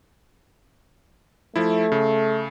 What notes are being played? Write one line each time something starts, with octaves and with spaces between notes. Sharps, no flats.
F3 A3 E4
C#3